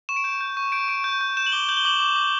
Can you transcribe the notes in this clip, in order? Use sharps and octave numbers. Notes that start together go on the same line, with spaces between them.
C#6 E7
D7
G6 E7
G6
C#6
G6 D7
C#6 D7
G6
G6
G6 E7
F#7
D6 G7
G6 F#7
G7
D6 F#7
D6
D6